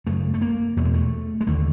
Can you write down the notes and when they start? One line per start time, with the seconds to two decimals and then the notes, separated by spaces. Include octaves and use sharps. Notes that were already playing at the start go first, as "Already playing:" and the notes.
0.07 F#2 C#3 A3
0.34 A3
0.41 A#3
0.77 E2 B2 A3
0.85 G#3
0.94 A3
1.41 G#3
1.47 D#2 D3 A3